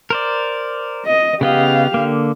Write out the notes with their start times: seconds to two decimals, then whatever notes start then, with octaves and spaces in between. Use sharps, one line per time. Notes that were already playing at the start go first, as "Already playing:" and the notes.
0.10 A#4 C5 D5
1.06 D#5
1.41 C#3 B3 G4 D#5 F5
1.94 D3 A#3